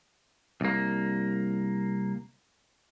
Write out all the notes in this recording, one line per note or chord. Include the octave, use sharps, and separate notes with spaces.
C2 A#3